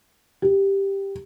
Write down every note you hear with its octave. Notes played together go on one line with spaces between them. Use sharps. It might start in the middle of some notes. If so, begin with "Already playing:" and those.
G4